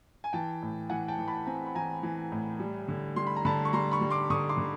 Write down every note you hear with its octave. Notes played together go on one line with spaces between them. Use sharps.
G#5
E3 G5 A5
A2
E3 F#5 G#5
G5 A5
E3
A5 B5
C4 G#5 A#5
B5
E3 G#5 A#5
E3
A2
G3
D3
G3 C6
B5
A#5
D3 A5 B5
C#6
G3 A#5 C6
B5 C#6
G3
C6 D6
D3 C#6 D#6
C6 D6
D3